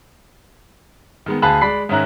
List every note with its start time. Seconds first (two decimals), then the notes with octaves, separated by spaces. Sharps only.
1.26 D#3 G#3 B3
1.42 D2 G#4 F5 A5 B5 F#6
1.61 G#3 D5 B5 B6 C7
1.89 G#2 D#3 C#4 E5 A#5 F#6